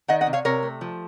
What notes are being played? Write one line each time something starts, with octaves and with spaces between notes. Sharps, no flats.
D#3 D#5 F#5
D#5 F#5
C3
C#5 F5
C3 A#4 C#5
A3
F3